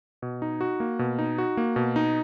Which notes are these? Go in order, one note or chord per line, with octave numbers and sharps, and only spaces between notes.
B2
D#4
F#4
A#3
B2
D#4
F#4
A#3
B2
D#4